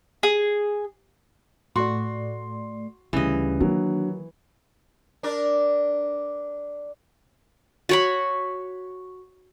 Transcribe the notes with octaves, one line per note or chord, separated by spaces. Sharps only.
G#4
A2 A3 F#4 D5 C6
D2 C#3 E3 G3 D#5
D#3 F#3 A#3 D4
D4 A#4 D5
F#4 C#5 B5